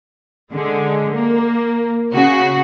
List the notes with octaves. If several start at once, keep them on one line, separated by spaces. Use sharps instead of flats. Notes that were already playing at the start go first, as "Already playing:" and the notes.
D3 G#3
A#3
C#3 F#4